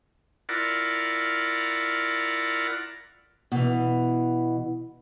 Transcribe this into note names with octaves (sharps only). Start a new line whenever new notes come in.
E4 F4 A#4 D5 F#5
B2 E3